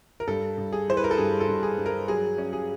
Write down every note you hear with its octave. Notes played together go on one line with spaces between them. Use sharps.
A#4
G2 A4
G2
G#4
E3 C5
B4
A#4
A4
G2 G#4
A4
G2
G#4
G2
A#4
F#3 G#4
C#4
G#4